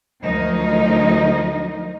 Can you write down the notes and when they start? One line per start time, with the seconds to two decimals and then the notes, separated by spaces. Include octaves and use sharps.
0.23 D2 F3 F#3 D#4 A#4 D#5